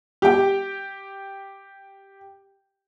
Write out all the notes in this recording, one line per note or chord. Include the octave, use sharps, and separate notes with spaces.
G4 G5